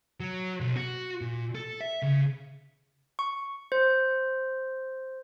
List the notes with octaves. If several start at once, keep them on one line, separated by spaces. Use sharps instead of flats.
F#3
B1
F#4
A#2
A4
E5
C#3
C#6
C5